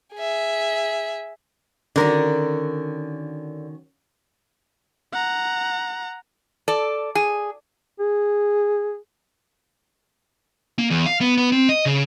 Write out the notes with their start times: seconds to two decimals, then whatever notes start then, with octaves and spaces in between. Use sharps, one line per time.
0.15 G#4 E5
1.96 D3 D#3 C#4 F#4 A#4
5.12 F#5 A#5
6.68 A4 D5
7.15 G#4
7.99 G#4
10.79 A#3
10.90 E2
11.06 F5
11.21 B3
11.37 B3
11.52 C4
11.69 D#5
11.86 C#3